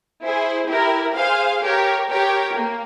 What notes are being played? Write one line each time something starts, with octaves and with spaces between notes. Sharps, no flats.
E4 G#4 C5
E4 G4 A#4
G#4 C5 F5
G4 A#4 C#5
G4 A#4 C#5 G5
A#3